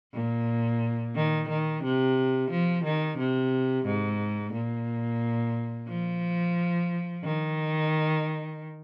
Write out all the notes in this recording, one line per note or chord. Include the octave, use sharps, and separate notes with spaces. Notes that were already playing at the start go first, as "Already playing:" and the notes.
A#2
D#3
D#3
C3
F3
D#3
C3
G#2
A#2
F3
D#3